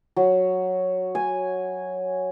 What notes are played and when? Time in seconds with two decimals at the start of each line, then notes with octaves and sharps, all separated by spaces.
0.16 F#3
1.15 G#5